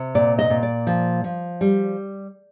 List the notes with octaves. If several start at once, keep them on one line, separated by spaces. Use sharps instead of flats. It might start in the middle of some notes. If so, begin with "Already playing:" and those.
Already playing: C3
A#2 D5
D#5
A#2
D5
F3
F3
G3